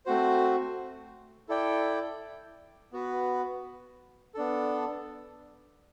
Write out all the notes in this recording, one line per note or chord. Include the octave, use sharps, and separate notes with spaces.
A3 C4 F#4 C5
E4 A4 D5 G5
B3 F#4 B4
B3 D4 A4